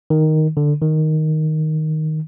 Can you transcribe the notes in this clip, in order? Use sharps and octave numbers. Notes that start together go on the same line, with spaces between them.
D#3
D3
D#3